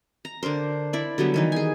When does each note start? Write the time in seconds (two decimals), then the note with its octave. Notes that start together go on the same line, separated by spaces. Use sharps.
0.25 A#5
0.43 D3 D4 A#4 C5
0.93 E4 D5
1.18 D3 F#3 G3 B3
1.34 D#3 E3 D#4
1.52 G#4 G#5